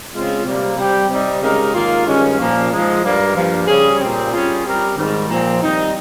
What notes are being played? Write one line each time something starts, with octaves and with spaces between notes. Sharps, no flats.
C#3 G#3 C4 F4
C3 G3 A#3
G3 C4 G4
C3 G3 C4 D#4
C#3 G#3 D#4 G4 A#4
G#2 D#3 A#3 F4
G2 D#3 G#3 C#4
A#2 F3 A#3
G#2 F3 G#3
G2 G3 A#3
G2 F3 A#3
C#3 G3 C#4 G#4
A#2 G3 C4
G3 C#4 F4 G#4
G3 C4 G4 A#4
G#2 D#3 G3
A#2 F3 C4
D#3 G3 C4 D#4